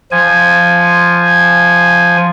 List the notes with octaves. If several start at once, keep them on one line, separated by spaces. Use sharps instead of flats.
F3 G#5